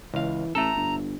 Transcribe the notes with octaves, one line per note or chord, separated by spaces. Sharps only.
C#2 E3 F5
A1 A3 A4 A#5
G1